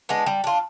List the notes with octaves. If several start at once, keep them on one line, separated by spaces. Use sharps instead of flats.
G#3 B3 D4
G3
D4 F4